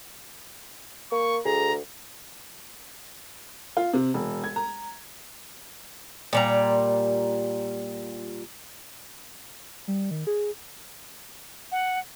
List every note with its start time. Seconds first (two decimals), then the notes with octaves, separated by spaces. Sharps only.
1.12 A#3 C#6
1.45 D2 G#4 A#5
3.77 F4
3.93 C3
4.14 E1
4.44 G#6
4.56 A#5
6.33 A#2 G3 A#5
9.88 G3
10.11 D#3
10.27 G#4
11.72 F#5